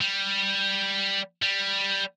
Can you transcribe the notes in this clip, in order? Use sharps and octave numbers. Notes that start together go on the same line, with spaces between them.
G3
G3